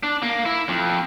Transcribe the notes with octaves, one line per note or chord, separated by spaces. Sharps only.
D4
A#3
E4
F2